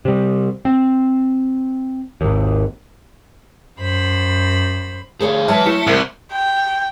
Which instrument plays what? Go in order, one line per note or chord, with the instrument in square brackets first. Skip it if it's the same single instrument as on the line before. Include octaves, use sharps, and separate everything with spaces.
[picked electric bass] C3 G3
C4
G#1 D#2
[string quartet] F#2 C5 B5
[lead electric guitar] D3 G#4 [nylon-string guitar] A3 C#5 D5
[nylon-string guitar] F#3 G#3 [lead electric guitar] E4 B4 [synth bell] E5 A5 F6
[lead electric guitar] A3 [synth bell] E4 C#7
[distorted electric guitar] C2 [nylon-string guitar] A#4 C5
[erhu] G5